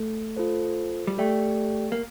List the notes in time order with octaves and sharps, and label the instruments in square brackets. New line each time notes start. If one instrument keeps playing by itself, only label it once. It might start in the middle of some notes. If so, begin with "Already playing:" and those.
Already playing: [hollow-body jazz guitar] A3
[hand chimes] F4 A4 C5
[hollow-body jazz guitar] G3
[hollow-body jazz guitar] A3 [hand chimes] G4 D5 G5
[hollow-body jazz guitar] A#3